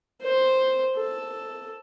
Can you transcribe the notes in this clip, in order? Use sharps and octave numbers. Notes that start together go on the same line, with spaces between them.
C5
A4